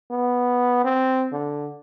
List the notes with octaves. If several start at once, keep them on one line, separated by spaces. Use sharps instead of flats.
B3
C4
D3